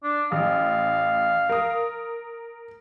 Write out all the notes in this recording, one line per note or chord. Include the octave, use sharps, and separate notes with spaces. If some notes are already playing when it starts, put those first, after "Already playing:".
D4
A1 F5
A#4 D#6